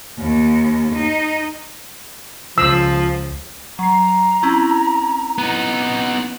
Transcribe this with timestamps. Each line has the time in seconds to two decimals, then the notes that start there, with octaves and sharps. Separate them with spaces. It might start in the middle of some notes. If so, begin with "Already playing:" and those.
0.19 D#2
0.94 D#4
2.58 C#2 F3 E6
3.79 F#3 A#5 C7
4.43 C4 C#4 E4
5.38 B3 D#4